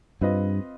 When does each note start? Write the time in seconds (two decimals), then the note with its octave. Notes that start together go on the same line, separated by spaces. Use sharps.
0.21 G2 C4 F4 B4 D#5